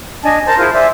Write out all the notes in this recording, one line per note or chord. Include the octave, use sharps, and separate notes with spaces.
D4 D#5 G#5 A5
A#4 C5 A5 A#5
E4 F4 G#4 C5
C5 D5 E5 G#5